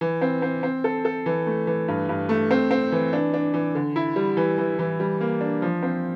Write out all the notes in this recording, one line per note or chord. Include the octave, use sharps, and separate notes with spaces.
E3
C4
C4
C4
A4
A4
E3
A3
E3
G2
G2
A3
C4
C4
E3
D4
D4
E3
D3
E4
G3
E3
E3
E3
G3
A#3
D4
F3
C4